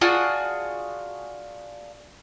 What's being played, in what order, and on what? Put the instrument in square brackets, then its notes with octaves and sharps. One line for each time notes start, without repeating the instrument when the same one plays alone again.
[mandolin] D4 F4 F#4 G#4